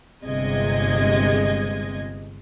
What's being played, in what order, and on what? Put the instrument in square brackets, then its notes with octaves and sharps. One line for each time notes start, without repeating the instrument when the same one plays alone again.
[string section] G1 C3 G#3 D#5 G#6